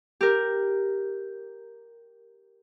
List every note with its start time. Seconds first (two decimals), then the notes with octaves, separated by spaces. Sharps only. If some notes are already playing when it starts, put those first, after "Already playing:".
0.21 G4 A#4